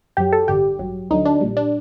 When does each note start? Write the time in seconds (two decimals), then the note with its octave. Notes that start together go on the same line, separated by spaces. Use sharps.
0.17 F#2 F#3 G4
0.33 A4
0.48 A1 G2 D3 G4
0.79 A1 G2 F#3
1.10 D2 D3 F#3 D#4
1.25 D4
1.41 A#1 A#2 G3
1.57 D4